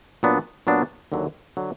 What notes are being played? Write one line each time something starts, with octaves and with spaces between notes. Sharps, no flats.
A#2 F#3 B3 D4
A#2 F#3 B3 D4
D#2 D3 F#3
D3 F#3